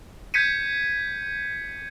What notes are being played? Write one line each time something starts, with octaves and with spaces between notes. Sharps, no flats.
G6 G#6 B6 C#7 D#7